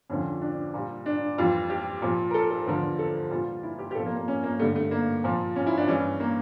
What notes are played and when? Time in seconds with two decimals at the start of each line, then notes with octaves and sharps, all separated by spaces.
0.09 F2 D3 F3 C#4
0.41 D4
0.74 A#2 G3
1.06 D4
1.38 F2 E3 G3 F4
1.70 G4
2.02 A#2 F3
2.31 A#4
2.34 A4
2.50 A4
2.67 E2 D3 F3 A#4
2.99 A4
3.31 A#2 G3 F4
3.63 E4
3.79 G4
3.91 G4
3.95 A#2 F3 A4
4.06 A#3
4.16 A#3
4.28 C#4
4.43 A#3
4.59 G2 D3 G3 A3
4.75 A3
4.91 A#3
5.24 A#2 F3
5.56 C#4
5.66 E4
5.77 D4
5.88 G2 E3 G3 C#4
6.20 A#3